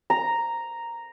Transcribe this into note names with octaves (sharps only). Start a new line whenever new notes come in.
A#5